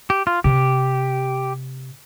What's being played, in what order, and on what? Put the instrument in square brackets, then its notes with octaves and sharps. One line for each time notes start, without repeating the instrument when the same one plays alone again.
[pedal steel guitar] G4
F4
[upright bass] C3 [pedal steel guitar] G4